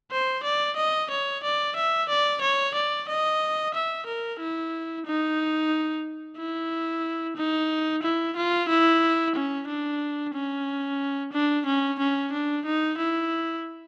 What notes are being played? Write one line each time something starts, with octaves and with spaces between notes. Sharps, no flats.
C5
D5
D#5
C#5
D5
E5
D5
C#5
D5
D#5
E5
A#4
E4
D#4
E4
D#4
E4
F4
E4
C#4
D4
C#4
D4
C#4
C#4
D4
D#4
E4